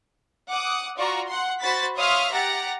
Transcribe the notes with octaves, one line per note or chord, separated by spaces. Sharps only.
F#5 D6 D#6
F4 F#4 D5 A#5 C#6
F#5 C6
F#4 C5 B5 A6 B6
C#5 E5 F5 C6 D#6 F6
G4 F#5 A#5 A6 A#6